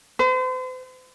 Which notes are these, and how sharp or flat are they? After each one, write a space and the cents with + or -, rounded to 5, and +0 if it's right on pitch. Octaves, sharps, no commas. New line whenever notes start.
C5 -40